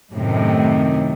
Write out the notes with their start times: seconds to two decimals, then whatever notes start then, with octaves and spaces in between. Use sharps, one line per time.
0.13 F#2 A2 C3 D#3